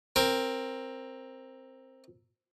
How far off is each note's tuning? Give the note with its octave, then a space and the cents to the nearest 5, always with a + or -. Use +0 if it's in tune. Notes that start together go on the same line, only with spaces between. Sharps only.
C4 +10 A#4 +0